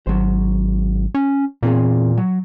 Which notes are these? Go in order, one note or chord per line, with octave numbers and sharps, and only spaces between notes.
G#1 F#3 C5
C#4
E2 A#2 C4 G#4
F#3